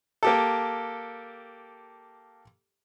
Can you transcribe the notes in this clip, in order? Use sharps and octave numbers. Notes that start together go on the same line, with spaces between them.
A#3 G4 A4